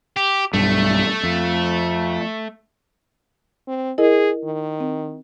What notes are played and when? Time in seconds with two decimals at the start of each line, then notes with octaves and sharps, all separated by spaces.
0.16 G4
0.54 B1 G2 A3
1.23 F2
3.68 C4
3.98 E4 G#4 A#4 D#5
4.44 D#3
4.80 C4